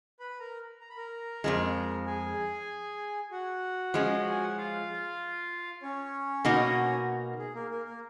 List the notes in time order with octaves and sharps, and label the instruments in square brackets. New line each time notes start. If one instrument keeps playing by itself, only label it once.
[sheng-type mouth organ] B4 B5
A#4 A#5
A#5
B5
A#4 A#5
[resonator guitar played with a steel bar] F2 F3 G#3
[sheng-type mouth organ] G#4 G#5
F#4 F#5
[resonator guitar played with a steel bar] F3 G#3 C#4
[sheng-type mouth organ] G#5
F#5
F4 F5
C#4 C#5
[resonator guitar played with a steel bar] B2 A#3 D#4 F#4
[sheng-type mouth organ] G#4
A#3 A#4
A#3 A#4
A#3 A#4